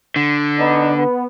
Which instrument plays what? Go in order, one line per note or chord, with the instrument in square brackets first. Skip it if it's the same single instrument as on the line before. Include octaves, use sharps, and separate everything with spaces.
[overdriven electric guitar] D3
[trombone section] B3 D4 D#4
B3